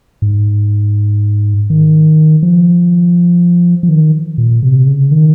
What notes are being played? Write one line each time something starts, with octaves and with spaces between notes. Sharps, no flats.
G#2
D#3
F3
F3
D#3
A#2
C3
C#3
D#3